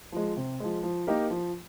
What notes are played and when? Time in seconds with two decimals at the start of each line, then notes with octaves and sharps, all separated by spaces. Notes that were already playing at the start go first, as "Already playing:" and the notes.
0.12 F3 G#3
0.37 C3
0.60 F3 G#3
0.83 F3
1.07 A#3 D#4 G4 A#4
1.30 F3